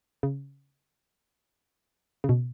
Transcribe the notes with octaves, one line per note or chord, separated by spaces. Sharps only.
C#3
C#3
B2